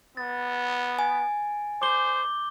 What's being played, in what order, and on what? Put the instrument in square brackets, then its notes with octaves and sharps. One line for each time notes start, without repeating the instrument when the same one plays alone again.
[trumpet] B3 [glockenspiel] A6
[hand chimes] G#5
[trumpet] C5 [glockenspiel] D6 G6 G7